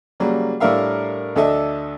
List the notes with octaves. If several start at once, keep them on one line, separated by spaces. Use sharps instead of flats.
C#3 F#3 G3 A#3
A2 G3 D4 A#4 E5 F5
D2 D4 A4 D#5 E5